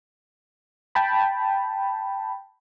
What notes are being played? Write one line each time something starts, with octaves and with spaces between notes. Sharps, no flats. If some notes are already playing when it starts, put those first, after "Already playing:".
G5 A5 B5